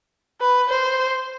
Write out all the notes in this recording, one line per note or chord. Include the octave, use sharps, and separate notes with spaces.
B4
C5